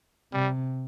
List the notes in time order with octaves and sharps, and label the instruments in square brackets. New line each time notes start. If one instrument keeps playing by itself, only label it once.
[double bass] C3 [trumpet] G3